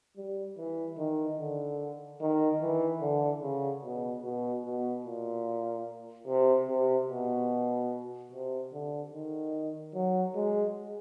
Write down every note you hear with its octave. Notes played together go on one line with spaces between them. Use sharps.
G3
E3
D#3
D3
D#3
E3
D3
C#3
B2
B2
B2
A#2
C3
C3
B2
C3
D3
D#3
F#3
G#3